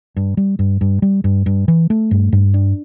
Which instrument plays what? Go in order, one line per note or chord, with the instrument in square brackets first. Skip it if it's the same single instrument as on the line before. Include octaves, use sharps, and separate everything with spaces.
[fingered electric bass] G2
G3
G2
G2
G3
G2
G2
E3
A3
G2
G2
D4